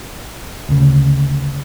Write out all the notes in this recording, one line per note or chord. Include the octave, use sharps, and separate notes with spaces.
D2 C#3